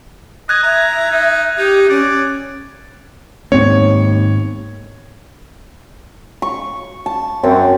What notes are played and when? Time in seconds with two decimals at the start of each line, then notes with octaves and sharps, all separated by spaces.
0.49 D#5 F#6 G#6
0.63 E5 A#5
1.11 D#4
1.58 D#4 G4
1.90 C#4 D5
3.52 D#2 G#2 B3 C4 C#5
6.42 C#6
7.06 A5
7.43 F#2 C4